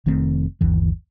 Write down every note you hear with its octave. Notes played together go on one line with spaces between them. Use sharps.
F1 D#3 A3 C4
G1 D#2 E3